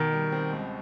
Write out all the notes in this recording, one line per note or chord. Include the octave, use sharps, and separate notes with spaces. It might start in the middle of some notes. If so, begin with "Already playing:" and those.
Already playing: B2 D#3
G3
C4
C#2